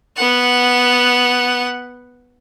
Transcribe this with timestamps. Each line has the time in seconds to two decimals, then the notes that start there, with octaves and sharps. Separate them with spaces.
0.17 B3 F#5